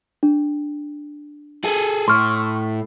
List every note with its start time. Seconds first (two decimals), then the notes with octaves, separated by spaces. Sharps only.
0.23 D4
1.64 G#4 A4
2.08 A2 C6 C#6 F6